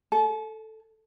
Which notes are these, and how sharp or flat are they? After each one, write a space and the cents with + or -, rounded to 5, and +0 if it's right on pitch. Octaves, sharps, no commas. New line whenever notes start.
A4 +0 A5 -45